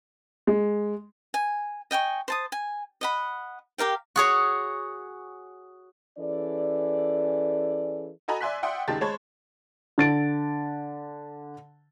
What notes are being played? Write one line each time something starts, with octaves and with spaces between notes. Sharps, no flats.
G#3
G#5
D#5 G5 G#5 C#6
C5 A5 D#6
G#5
D#5 F#5 B5
G4 A#4 F5 G5
F#4 G#4 C#5
E3 C#4 G#4 A4 D5
F#4 A4 D#5 G#5 A#5 B5
D5 E5 G#5 C6 F#6 B6
D5 E5 F#5 G5 C6 D#6
C#2 D#3 G#3 G4 A5 A6
G#3 C5 C#5 A5 B5 G#6
D3 A6 D7